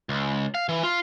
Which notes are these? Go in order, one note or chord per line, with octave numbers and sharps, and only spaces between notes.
C#2
F5
E3
F4